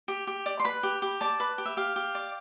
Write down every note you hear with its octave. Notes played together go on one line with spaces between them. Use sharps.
G4
G4
D5
C6
B4 B5
G4
G4
D5 A5
B4
G4
E5
G4 F5
G4
D5